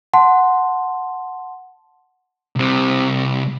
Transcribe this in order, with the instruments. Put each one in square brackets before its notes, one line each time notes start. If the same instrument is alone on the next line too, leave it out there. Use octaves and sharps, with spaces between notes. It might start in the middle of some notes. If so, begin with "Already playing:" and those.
[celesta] F#5 A5 C6
[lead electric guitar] C2 C3